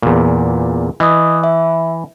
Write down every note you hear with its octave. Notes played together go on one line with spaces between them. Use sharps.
E2 A#2
E3 D#5 D#6
E5